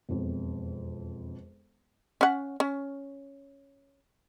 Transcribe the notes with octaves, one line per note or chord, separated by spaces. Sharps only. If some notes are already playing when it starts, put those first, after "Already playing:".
E1 F2
C#4 F#5
C#4